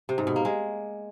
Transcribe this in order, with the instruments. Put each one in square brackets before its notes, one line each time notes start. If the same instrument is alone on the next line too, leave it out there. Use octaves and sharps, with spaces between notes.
[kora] C3
G#2
B2
A#3
G#3